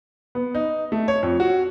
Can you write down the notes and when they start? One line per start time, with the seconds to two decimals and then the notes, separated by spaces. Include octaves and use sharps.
0.35 B3
0.55 D#4
0.92 A3
1.08 C#5
1.23 F2
1.40 F#4